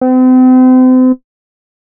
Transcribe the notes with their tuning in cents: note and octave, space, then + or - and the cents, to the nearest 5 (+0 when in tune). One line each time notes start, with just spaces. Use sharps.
C4 -40